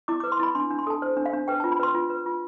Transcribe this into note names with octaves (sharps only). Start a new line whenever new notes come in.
E4 D6
B4 D6
C6
E4 B5
D4 C6
D4
C6
A4 A5
C5
D4
F5
D4
B4 G5
F4 A5
B5
B4 C6
F4
B4
F4